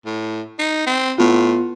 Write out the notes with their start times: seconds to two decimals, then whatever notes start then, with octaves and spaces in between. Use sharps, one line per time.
0.06 A2
0.59 D#4
0.87 C4
1.18 A2 B3 F4